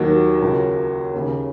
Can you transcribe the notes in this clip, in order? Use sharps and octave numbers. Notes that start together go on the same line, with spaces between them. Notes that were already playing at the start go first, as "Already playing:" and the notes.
Already playing: D#2 D#3 F#3 A#3
C#2 C#3
D#2 C#3